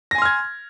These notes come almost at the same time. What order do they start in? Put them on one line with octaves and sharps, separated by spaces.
A#6 G#5 C6 F6 G#6